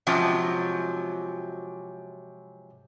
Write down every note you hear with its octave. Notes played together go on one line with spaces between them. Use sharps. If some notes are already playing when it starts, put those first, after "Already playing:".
G#2 C3 F3 F#3 C#4